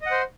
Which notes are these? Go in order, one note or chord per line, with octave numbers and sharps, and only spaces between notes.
C5 D#5 F#5